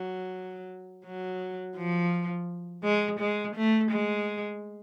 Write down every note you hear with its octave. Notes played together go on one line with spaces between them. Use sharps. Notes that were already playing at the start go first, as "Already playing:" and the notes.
Already playing: F#3
F#3
F3
G#3
G#3
A3
G#3